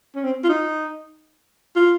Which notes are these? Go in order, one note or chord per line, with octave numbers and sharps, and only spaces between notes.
C#4
C4
F4
D#4
F4